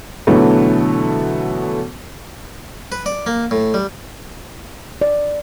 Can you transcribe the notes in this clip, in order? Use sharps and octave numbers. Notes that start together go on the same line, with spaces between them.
B2 D3 E3 F#3 A3 B3
B4
D5
A#3
A2
G3
D5